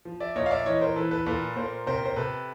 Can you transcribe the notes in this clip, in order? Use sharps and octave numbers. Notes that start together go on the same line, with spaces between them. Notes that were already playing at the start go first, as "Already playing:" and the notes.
F3
D5 E5
A#2 C#5 D#5
F5
D5 E5
E3 C#5 D#5
A#4 C5
E3 A4 B4
A4 B4
A#2 A4 B4
A#2 A#4 C5
C3 A#4 C5
C5
C3 A4 B4